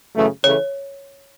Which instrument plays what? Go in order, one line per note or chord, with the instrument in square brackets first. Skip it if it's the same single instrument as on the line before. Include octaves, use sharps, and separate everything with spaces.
[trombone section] F#2 C#3 E3 A3
[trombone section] C#3 E3 A3 [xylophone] C#5